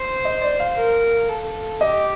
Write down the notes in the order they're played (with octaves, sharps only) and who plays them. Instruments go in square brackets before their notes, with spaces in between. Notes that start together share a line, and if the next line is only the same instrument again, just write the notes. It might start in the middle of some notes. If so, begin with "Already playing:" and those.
Already playing: [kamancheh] C5
[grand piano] D#5
D5
F5
[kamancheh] A#4
A4
[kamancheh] G4 [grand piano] D#5